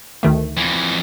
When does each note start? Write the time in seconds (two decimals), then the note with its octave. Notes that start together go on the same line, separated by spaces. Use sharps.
0.23 D2 D#3 A3
0.57 F2 E3